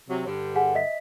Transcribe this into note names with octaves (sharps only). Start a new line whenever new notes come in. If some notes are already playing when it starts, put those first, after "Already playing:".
C3 F#3
G2 D3
G#4 F#5 G#5
D#5 E5 B6